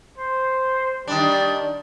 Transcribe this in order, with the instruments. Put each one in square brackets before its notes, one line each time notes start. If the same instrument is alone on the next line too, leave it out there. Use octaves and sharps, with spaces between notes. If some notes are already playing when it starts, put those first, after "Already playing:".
[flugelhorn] C5
[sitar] D#3 D4 [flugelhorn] G3